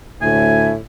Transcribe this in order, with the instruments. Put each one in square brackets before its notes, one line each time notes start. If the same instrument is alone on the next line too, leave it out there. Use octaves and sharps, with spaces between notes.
[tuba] D2 [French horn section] A2 [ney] E5 [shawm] G#5